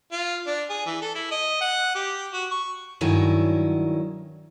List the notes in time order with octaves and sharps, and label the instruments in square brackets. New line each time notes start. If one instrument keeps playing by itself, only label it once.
[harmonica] F4
D4
G#4
E3
A4
E4
D#5
F#5
G4
F#4
C#6
[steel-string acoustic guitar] G2 D#3 F#3 E4 C#5 G#5